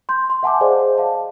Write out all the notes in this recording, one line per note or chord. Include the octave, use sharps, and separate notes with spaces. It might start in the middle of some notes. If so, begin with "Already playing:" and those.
C6 G6
C6
E5 F#5 G#5 A5 C6 D6
G#4 C5 D5 D#5 F5
F5 A5